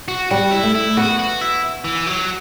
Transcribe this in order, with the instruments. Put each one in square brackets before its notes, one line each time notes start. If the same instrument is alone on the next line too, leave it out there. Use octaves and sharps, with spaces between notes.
[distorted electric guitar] F#4
[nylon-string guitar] G3 [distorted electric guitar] F#4
[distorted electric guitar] E4
[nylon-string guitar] A3
[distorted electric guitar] E4
[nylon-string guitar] B3 [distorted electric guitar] F#4
[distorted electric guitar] F#4
E4
E3
F#3